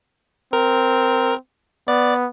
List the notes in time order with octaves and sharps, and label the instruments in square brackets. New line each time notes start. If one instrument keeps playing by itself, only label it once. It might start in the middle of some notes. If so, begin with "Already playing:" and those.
[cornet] C4 [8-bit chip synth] A#4
[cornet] B3 [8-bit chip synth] D5